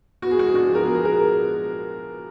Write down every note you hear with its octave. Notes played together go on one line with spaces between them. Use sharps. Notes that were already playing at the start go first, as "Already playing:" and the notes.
B3 F#4
G#4
G#3 F#4
G#4
D4 F#4
F3
A#4
B3 G#4
G#4
G#3 A#4